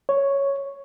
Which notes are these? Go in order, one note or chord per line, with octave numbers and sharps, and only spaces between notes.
C#5